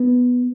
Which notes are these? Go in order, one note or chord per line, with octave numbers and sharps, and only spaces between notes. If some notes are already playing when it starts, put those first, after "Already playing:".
Already playing: B3